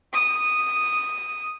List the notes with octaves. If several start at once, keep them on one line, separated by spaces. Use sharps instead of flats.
D#6